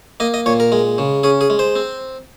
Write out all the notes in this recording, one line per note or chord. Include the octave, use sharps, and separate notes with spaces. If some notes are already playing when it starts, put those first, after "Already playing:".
A#3 D#5
D#5
A#2 C#5
A#4
G#3
C#3
C#4 G#4
G#4
G#3
C5
C4